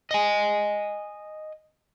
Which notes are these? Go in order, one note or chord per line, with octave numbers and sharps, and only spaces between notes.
D#5 G#5